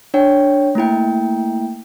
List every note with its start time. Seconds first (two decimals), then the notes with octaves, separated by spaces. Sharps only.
0.14 D4 C#5 G5
0.75 A3 A#3 E4 G5